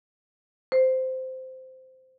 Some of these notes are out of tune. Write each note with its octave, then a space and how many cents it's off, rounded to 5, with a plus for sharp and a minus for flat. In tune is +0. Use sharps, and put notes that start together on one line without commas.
C5 -10